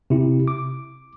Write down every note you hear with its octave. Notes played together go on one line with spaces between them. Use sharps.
C3 E4
D6